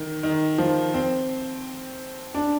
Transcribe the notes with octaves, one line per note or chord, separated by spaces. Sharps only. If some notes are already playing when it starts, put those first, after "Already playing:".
Already playing: D#3
D#3
F3
C4
D4